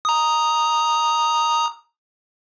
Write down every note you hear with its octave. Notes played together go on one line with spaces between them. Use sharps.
A#5 D#6